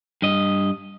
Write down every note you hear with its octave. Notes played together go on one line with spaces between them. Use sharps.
G2 D#5